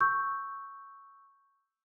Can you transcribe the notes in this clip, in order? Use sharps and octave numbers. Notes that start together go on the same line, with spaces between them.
C#6 E6 G6